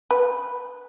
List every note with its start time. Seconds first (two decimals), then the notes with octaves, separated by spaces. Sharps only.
0.11 B4